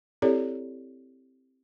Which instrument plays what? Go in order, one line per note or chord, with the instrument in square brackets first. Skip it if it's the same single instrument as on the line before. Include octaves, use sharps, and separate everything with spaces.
[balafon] C4 E4 G4 A4 C#5 D5